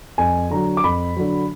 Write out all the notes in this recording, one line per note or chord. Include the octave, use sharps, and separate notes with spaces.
F2 G#5
D3 F#3 A#5
D6
F2 B5
D3 F#3